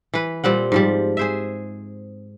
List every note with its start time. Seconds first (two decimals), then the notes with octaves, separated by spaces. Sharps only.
0.14 E3 B4
0.44 A#2 G3 C4 F#5
0.72 G#2 F3 G3
1.17 G#4 C5 E5